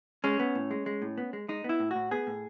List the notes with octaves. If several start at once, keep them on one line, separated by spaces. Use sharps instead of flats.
G#3 C#4
B3
A2
G#3
G#3
A2
B3
G#3
G#3 D#4
B3
E4
A2
A2 F#4
B3 G#4
A2